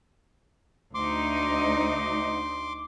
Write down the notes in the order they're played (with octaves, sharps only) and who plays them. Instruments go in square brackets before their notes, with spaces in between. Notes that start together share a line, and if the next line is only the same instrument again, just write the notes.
[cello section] D2 D#4 [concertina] C6 D6